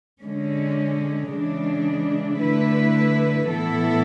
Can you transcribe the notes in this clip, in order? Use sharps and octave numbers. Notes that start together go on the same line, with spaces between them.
D3 G#3 C#4
C#3 E3 G#3 D4
D3 A3 E4 B4
A2 E3 B3 E4 A4